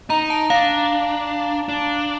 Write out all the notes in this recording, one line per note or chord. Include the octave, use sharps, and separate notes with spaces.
D#4 A#5
A5
D4 F5
D4